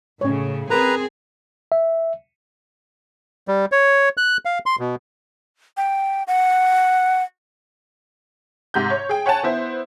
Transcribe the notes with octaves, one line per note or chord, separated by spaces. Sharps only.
A2 C#3 C#4 C#5
C4 G#4 A#4 B4 A#5
E5
G3
C#5
F#6
F5
C6
B2
G5
F#5
G#2 C3 G6
C#5
G#4 G5
C#5 F#5 G#5 A5
B3 E4 C5